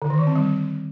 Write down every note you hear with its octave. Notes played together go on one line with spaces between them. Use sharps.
D3
D#3
E3
C4
G3